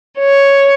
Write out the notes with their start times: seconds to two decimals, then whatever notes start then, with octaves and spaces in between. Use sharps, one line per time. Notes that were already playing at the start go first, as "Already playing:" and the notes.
0.19 C#5